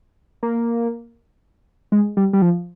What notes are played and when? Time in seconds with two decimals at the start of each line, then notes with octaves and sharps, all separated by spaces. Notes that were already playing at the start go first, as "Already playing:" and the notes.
0.43 A#3
1.92 G#3
2.17 G3
2.33 G3
2.42 F3